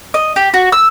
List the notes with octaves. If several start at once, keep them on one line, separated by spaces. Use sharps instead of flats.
D#5
G4
F#4
E6